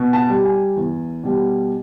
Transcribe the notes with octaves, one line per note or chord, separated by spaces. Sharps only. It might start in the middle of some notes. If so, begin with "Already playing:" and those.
Already playing: B2
A5
G3
G#5
E2
B2 G3